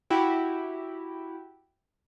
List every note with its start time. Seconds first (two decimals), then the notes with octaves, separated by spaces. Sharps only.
0.10 E4 F#4 G4